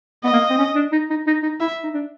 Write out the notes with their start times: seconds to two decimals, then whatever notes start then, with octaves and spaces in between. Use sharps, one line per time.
0.24 B3 D#5
0.32 A#3
0.50 C4
0.58 C#4
0.75 D4
0.92 D#4
1.10 D#4
1.27 D#4
1.43 D#4
1.60 E4 E5
1.84 D#4
1.94 D4